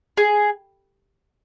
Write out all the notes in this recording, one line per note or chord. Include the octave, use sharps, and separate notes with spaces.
G#4